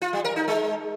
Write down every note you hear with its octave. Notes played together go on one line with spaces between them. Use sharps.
F4
G3
A#4
D#4
G#3